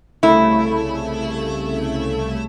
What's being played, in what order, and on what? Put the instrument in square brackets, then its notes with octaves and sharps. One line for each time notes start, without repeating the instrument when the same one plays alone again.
[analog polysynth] C2 C#3 A3 [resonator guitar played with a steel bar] E4